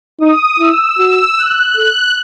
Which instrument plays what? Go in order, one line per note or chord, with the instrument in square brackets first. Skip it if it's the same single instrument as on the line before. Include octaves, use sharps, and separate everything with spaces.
[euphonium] D#4 [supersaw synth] D#6
[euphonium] E4 [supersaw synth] E6
[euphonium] F#4
[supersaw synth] F#6
[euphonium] A4